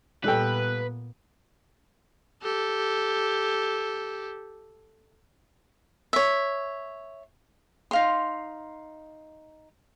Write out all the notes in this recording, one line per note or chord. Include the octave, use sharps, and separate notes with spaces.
A#2 G3 B3 A4 B4 G5
G4 A4
C#5 E5
D#4 F5 C6